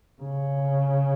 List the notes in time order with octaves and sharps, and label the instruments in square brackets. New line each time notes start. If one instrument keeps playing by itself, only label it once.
[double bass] C#3